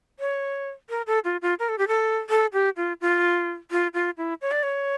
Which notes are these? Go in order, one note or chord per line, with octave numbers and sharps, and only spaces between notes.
C#5
A#4
A4
F4
F4
A#4
A4
G4
A4
A4
G4
F4
F4
F4
F4
E4
C#5
D5
C#5